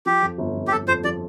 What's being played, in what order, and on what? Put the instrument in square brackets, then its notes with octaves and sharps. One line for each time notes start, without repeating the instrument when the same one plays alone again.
[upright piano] F3 [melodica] G4
[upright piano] F2
G1
F2
[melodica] G4
[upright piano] G1 [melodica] A4
[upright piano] F2 [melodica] C5
[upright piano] F3 [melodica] D5